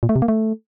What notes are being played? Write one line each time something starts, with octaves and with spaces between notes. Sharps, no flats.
A#2
A3
C3
A#3
A3